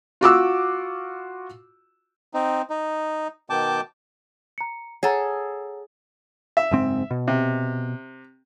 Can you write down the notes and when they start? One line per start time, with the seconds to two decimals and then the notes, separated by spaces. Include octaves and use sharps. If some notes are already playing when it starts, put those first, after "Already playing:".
0.21 F4 F#4 D6 E6
2.34 C4 D#4
2.70 D#4
3.50 B2 D#3 G5 A5 D6
4.58 A#5 C#7
5.03 G#4 A4 C#5 F#5 A#5
6.57 E5
6.71 F#1 G#2 C4
7.11 B2
7.28 C3